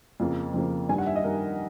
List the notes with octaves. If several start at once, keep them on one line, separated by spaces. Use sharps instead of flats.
F2 C#3 F3 A#3
F2 C#3 F3 A#3
G2 D#3 G3 G#5
F#5
E5
D#5
G2 D#3 G3 A#4